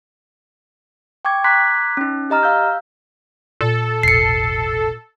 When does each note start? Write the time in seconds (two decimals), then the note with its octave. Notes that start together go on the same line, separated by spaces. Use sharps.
1.25 G5 C#6 D6 G#6
1.44 A#5 C6 D6 F#6 G#6 B6
1.97 C#4 D#4
2.30 G4 D#5 A#5 F6
2.43 F5 E6 G6
3.61 A#2 A4
4.03 E1 A1 C7 C#7